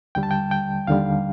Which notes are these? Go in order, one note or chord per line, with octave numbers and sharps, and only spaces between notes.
D#2 D3 G3 G5
A5
G5
G5
D#2 D3 G3 F5